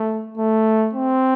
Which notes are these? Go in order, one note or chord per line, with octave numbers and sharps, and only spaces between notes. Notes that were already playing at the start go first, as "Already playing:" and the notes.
Already playing: A3
A3
C4